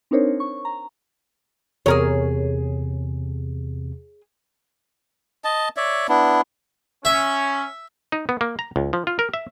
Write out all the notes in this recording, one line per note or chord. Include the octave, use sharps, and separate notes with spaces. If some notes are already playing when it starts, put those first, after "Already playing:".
C4 D4 D#4 A#4 C5 C#5
C#6
A#5
E2 C3 G#4 A#4 C#5
D#5 A5
C#5 D5 E5
B3 D4 E4
C#4 E5
D#4
B3
A#3
A#5
C#2
F3
F4
A#4
E5